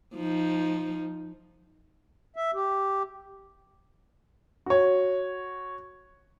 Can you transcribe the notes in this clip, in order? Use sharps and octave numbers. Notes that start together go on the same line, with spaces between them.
F3 D#4
E5
G4
F#4 C#5